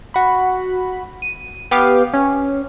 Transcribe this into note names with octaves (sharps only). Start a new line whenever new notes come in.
F#4 B5
D#7
B3 G4 F5
C#4